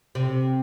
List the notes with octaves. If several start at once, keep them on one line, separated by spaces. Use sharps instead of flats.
C3